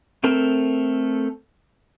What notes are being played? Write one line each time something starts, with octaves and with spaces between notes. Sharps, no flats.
A3 C4 A4 A#4